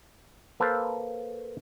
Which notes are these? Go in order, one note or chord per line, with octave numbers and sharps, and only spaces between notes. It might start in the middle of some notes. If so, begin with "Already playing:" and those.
A#3 A4 B4 C5 F5